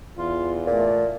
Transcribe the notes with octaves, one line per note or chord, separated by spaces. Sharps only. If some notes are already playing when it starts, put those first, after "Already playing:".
E2 F4
A#2 A3